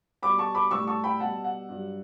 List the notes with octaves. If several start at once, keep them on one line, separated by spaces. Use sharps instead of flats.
B2 G3 B5 D6
A5 C#6
B5 D6
A2 G3 C#6 E6
A5 C#6
G5 B5
B2 G3 F#5 A5
F#5
G2 F#3